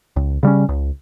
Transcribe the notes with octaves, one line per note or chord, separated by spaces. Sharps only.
C#2
C#3 G3 C#4
C#2